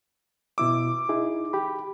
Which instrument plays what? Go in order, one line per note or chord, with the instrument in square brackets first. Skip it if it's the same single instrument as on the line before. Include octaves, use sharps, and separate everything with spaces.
[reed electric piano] B2 E4 E6 [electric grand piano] D6
[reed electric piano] D#4 E4 G#4
G4 B5